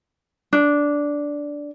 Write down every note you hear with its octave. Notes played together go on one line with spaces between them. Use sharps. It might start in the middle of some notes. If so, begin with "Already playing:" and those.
D4